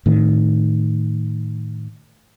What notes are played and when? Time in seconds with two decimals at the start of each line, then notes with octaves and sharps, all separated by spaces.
0.06 A2 D#3